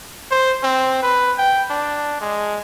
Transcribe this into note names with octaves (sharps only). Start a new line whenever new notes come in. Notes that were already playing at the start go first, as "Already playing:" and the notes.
C5
C4
B4
G5
D4
G#3